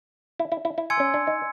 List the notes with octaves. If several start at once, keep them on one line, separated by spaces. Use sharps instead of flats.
E4
E4
E4
E4
G#5 C6 E6 G#6 C#7
C#4
D4
D#4